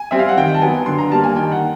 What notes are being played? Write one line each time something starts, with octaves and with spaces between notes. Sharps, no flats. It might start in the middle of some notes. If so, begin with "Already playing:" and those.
Already playing: G#5
G3 C4 E5
F5
F#5
D#3 G5
A5
F#3 B3 G#5
D3 C6
A#5
G3 A#3 A5
G#5
D#3 G5
F#5